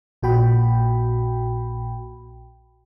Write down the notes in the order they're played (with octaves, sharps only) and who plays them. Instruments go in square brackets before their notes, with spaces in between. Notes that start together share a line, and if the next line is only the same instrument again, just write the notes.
[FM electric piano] A#1 A#2 F#4 G5 B5